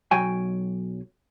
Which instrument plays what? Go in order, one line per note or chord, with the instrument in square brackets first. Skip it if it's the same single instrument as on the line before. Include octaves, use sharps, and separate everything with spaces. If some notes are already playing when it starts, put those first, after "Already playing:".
[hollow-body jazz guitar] B1 F#3 F#4 G5 G#5